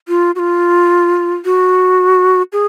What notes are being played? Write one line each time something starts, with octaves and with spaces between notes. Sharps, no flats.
F4
F#4
F4
F#4
G#4